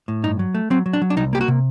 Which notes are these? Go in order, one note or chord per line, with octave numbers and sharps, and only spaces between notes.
A2
G2 D#4
F#3
A3
F#3 C4
F#3
D4
F#3
D4
C2 D#4
A#3 G4
F#4
C3